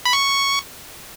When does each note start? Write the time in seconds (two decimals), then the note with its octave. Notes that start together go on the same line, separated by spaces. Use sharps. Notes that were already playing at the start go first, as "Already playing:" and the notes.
0.05 B5
0.13 C#6